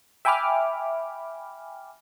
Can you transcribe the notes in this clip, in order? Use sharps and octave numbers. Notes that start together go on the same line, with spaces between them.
E5 G5 G#5 B5 D6 F6